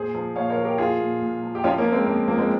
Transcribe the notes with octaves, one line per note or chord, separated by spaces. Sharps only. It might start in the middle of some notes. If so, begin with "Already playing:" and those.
Already playing: A#2 G#4 C5
F3
A#2 C#5 F5
A#4 C#5
F3
G4 A#4
A#2 F4 G#4
A#2
A#2
F3
G4
F3 C#4 F4
A#3 C#4
F3
G#3 C4
F3 A#3
F3 A#3
G#3 C4